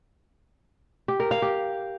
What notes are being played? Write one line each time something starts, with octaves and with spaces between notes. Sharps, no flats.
G4
A#4
F5
G4